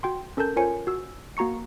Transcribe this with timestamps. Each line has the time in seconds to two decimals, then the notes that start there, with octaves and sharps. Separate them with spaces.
0.03 F#4 G5 C6
0.37 C#4 A4 A#4 A5 G6
0.57 F4 A#4 C5 C#5 G#5 C#7
0.87 F#4 E6
1.37 A#3 F#4 A#5 C#6 C#7